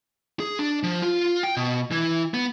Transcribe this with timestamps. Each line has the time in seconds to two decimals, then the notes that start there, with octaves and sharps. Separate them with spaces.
0.40 G#4
0.59 D4
0.83 F3
1.02 F4
1.43 G5
1.57 B2
1.91 E3
2.34 B3